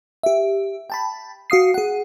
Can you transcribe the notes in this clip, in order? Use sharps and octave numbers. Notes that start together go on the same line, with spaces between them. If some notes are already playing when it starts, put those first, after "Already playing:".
G4 E5
G5 A5 B5
F#4 F5 D#6 C7
G#4 F#5